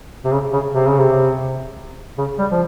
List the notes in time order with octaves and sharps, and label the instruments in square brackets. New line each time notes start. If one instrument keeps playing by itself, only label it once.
[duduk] C3
C#3
C#3
C3
C#3
C3
C#3
G3
F3